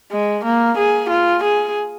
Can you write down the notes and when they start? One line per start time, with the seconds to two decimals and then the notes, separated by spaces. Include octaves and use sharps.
0.11 G#3
0.45 A#3
0.78 G#4
1.10 F4
1.43 G#4